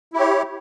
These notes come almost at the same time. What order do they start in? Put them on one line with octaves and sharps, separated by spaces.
E4 G4 C#5